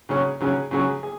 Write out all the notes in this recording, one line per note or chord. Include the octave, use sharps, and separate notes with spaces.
C#3 F#3 C#4 G#4
C#3 F#3 C#4 G#4
C#3 F#3 C#4 G#4
G#4